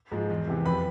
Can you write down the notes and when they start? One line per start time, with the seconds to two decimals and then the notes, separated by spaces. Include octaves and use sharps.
0.12 G#2 F3 G#3
0.30 E2
0.47 C3 E3
0.65 F2 B4 B5